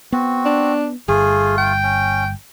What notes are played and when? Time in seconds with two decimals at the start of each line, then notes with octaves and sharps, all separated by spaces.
0.12 B3 C4 F#4
0.45 D4
1.08 G1 G2 A3 F4 G#4
1.57 G5
1.83 C#4